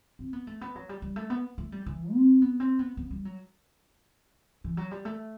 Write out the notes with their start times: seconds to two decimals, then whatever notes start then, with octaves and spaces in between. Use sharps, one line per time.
0.19 C4
0.33 B3
0.47 A3
0.61 B3
0.75 F#3
0.89 G3
1.02 G3
1.16 A3
1.30 B3
1.58 A3
1.72 G3
1.86 E3
2.14 C4
2.42 B3
2.60 C4
2.79 B3
2.97 B3
3.11 G3
3.25 F#3
4.64 E3
4.77 F#3
4.91 G3
5.05 A3